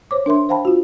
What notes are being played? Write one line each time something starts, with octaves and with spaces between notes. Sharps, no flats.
C5 C#5 D6
D4 A#4 E5 C6
C5 F5 G5 A5 B5
F4 F#4